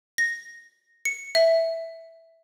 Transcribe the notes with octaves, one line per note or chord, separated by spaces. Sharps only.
A#6
C#7
E5